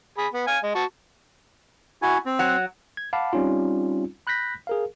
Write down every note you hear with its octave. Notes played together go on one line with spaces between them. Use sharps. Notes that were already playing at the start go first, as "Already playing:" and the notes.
G#4 B5
B3
F5 G#5
G#3
F#4 A5
E4 F#4 G#5
C4
F#3 F#5
G#6
F5 F#5 A5 B5 D6
G3 C4 C#4 D#4 F4
B5 F#6 G6 A#6 B6
G#4 A#4 F5